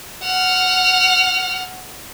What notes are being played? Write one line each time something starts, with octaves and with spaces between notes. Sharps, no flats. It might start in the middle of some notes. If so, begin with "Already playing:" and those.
F#5 F6